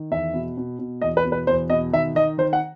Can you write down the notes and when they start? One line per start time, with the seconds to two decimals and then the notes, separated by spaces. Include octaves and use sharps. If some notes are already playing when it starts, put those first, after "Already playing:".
Already playing: D#3
0.11 E2 E5
0.34 B2
0.57 B2
0.79 B2
1.02 E2 D#5
1.17 B4
1.25 B2
1.32 B4
1.47 E2 C5
1.70 B2 D#5
1.93 D#3 E5
2.15 D#3 D#5
2.38 D#3 C5
2.53 F#5